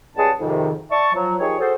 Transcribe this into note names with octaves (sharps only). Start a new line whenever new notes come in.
C#2 C#3 G3 G#4 F#5 A5
F2 G#2 C3 D#3
D5 E5 A5 C#6
F3 F#3
D#3 F3 G4 G#4 C#5
F#4 G#4 A4 C5